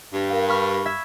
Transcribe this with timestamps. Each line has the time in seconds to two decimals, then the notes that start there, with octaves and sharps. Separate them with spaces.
0.14 G2
0.30 A#4 F5
0.48 B5 C#6 F6
0.86 E5 G#6